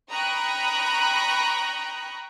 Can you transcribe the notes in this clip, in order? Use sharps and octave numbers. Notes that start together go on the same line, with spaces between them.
G5 A#5 B5 C#6 D#6 F#6